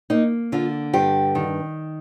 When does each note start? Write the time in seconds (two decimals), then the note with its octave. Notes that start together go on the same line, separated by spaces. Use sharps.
0.10 A#3 D#4
0.52 D3 F4
0.94 G2 G4
1.35 D#3